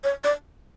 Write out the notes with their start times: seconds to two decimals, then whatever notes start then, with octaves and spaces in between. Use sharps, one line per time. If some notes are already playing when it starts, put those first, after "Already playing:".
0.04 C#5
0.24 D5